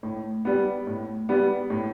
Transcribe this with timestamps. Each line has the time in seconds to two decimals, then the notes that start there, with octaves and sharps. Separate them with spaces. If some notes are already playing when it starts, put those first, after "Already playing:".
0.03 A2
0.45 G3 B3
0.87 A2
1.29 G3 B3
1.70 A2